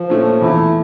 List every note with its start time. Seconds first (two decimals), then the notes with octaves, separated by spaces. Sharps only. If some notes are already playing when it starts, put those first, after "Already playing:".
Already playing: F3
0.10 A#2 A3 C#4
0.40 E2 E3 A3 E4